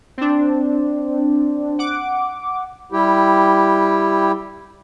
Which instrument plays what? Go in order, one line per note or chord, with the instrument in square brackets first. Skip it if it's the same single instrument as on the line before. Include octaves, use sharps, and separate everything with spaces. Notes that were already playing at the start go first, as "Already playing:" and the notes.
[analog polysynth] C4 D4
F#5 D6
[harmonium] G3 E4 G4